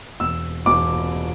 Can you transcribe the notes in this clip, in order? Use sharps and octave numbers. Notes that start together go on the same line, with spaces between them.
E1 E6
E1 D6